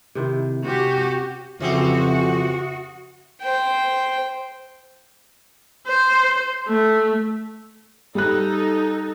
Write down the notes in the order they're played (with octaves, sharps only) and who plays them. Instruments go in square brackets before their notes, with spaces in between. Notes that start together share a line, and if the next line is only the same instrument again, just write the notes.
[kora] C3 D#3 E4
[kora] C3 C#4 [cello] F#4 G4
[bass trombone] F2 [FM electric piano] C#3 E5 D#6 [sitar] E3 C4 G4 [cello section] F#4
[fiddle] C5 G5
[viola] C5
A3
[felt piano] G3 F#6 [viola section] D#4 A4